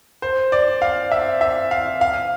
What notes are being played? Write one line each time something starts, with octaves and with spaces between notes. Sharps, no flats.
C5
D5
F5
E5
E5
F5
F5